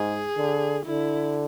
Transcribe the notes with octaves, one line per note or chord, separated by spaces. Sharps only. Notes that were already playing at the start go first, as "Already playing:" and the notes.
Already playing: G#2 G#4
D3
D3 E4